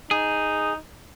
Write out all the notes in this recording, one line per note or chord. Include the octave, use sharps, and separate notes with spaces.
D#4 G#4